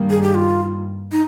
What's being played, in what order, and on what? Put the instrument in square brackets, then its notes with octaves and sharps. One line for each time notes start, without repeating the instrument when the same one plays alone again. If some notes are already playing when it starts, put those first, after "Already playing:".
Already playing: [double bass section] G2 D#3 G3 A#3
[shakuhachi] G#4
G4
F4
D#4